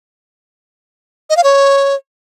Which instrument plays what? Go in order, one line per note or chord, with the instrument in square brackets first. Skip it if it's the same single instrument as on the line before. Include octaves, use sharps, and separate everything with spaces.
[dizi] D#5
F5
C#5